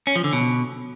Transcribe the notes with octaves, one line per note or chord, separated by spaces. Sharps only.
C#4
F3
D3
B2